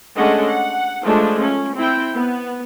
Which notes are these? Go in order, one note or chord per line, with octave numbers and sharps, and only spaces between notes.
G#3 A3 C#4 D4 D#5 F#5
F#5
F3 G#3 A3 D4 F4
C#4
C4 E4 G5
B3